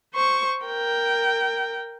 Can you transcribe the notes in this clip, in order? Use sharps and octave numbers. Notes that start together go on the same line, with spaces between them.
C5 C#6
A#4 G5